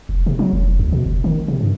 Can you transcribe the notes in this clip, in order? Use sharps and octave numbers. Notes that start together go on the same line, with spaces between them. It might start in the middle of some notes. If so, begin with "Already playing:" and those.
F1
C3
F#3
F1
D2
B2
F#1
D#3
C3
G2